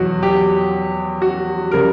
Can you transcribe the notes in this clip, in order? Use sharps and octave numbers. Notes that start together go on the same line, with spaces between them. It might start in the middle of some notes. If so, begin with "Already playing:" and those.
Already playing: E2 B2 F#3 F#4
G4
F#4
C#3 G3 A#4